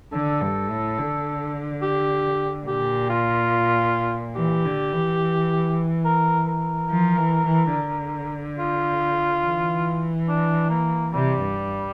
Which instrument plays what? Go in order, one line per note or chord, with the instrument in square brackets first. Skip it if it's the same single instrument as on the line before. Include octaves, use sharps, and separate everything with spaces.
[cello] D3 [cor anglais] A4
[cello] G2
A2
D3
[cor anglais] G4
[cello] A#2 [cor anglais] G4
[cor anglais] F4
[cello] E3 [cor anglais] G4
[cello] D3
E3
[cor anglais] A#4
A#4
[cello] F3
E3
E3
D3
[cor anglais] F4
[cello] E3
[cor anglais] D4
A#3
[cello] C3 [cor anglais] G3
[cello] G2